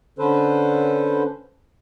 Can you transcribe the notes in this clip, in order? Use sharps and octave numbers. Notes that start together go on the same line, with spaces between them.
D3 C#4 A4 B4 C5